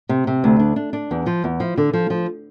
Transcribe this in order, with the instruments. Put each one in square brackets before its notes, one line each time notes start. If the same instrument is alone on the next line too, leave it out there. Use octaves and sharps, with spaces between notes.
[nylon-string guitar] C3
C3
D2
D4
D4
D4
E2
F3
E2
F3
D3
F3
F3